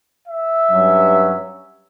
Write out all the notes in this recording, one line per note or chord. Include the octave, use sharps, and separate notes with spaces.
E5
G2 F#3 C#4